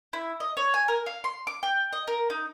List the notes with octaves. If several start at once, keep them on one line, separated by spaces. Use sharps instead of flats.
E4
D#5
C#5
G#5
A#4
F5
C6
D6
G5
D#5
A#4
D#4